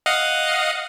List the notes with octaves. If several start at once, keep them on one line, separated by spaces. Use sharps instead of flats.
D#5 F5 F#5